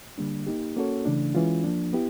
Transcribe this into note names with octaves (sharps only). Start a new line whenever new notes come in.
D3 G3 A#3 D4
A#3 D#4 G4
A#3 C#4 F#4 A4 C#5
C#3 E3 A3 D4
E3 G#3 C#4 F4
F3 A#3 D4
B3 E4 G4